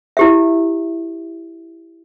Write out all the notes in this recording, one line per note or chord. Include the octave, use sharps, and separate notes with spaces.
E4 G4 E5